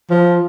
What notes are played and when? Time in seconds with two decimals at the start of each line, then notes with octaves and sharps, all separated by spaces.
0.10 F3